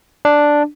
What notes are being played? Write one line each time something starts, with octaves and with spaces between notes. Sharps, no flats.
D4